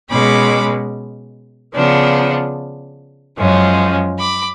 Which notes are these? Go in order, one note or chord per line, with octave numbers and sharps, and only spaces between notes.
B2 G#3 C#4 B5 D6
C#3 F3 B3 D4
F#2 F3 G#3 C#4
B5 D6